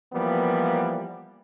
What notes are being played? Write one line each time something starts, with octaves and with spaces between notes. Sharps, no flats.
E3 F3 G3 A#3 B3